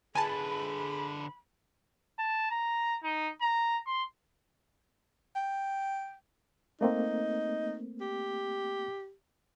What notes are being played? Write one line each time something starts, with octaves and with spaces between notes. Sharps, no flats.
D3 G#4 B4 G#5 A5 B5
A5
A#5
D#4
A#5
C6
G5
A3 A#3 C4 D#4
G4